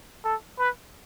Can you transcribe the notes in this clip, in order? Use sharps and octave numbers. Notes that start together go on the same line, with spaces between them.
A4
B4